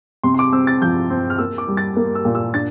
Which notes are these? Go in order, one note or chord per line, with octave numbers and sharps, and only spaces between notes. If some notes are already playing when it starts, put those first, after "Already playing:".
C3 C6
C6
D6
C4 E6
A6
F3 G6
C4
F6
A#3 E6
D6
G3
A6
A#3
E6
A#2
E6
D4 A6